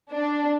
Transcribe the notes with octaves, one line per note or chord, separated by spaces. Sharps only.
D4